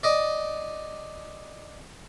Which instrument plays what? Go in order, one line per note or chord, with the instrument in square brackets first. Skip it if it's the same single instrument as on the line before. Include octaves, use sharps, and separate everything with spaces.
[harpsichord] D5 D#5